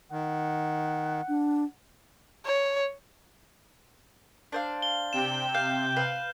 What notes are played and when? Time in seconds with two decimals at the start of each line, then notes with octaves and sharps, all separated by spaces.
0.12 D#3 F#5
1.28 D4
2.45 C#5
4.52 D4 C5 F5
4.82 G7
5.13 C3 G5 E7
5.55 F5 G6
5.96 B4 F5